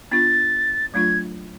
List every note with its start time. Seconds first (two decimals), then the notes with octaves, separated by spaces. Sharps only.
0.11 B3 D4 F4 A6
0.94 F#3 A3 D4 F4 G#6